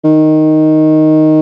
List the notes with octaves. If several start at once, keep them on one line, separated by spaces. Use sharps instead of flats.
D#3